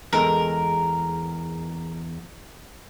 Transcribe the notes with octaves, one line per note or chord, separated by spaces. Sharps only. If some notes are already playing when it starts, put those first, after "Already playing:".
E2 G#3 A4 A#4